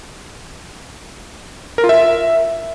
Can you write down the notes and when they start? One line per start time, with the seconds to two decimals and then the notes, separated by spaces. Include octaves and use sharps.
1.78 A#4
1.84 F4
1.89 E5